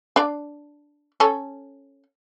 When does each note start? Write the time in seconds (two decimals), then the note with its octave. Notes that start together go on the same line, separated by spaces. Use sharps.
0.16 D4 D5
1.20 C#4 A4